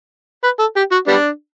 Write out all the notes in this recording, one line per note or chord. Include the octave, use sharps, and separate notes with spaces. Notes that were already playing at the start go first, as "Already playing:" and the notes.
B4
A4
G4
F#4
G3 B3 D4